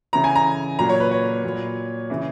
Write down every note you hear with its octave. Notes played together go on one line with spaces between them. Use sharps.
C#3 E3 A#5
G#5
A#5
A#2 F#3 A#5
C#5
B4
C#5
A#2 F#3
C#3 E3